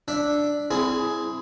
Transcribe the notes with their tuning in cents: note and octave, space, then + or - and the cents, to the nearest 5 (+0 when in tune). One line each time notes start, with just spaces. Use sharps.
D4 +0 E5 +0
C4 -15 E4 +0 G#4 +10